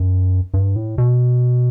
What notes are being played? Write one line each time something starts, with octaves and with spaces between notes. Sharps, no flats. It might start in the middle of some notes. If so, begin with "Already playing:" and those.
Already playing: F#2
G2
A2
B2